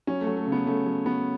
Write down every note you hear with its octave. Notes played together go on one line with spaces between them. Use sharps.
F#3 C#4
A3
F#3
A3
C#3
B3
C#3 A3
F#3
F#3 B3